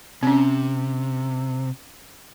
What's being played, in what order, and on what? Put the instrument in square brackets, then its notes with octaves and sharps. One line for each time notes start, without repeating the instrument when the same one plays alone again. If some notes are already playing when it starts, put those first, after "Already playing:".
[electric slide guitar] C3 [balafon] C4 C#4